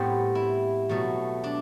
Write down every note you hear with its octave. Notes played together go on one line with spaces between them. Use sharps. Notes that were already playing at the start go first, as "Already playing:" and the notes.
Already playing: A2 G3 B3 C4
E4
B2 F#3 A3
D4